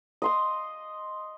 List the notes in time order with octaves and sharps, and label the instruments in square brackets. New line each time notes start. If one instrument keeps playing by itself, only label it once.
[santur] D#5 C6 D#6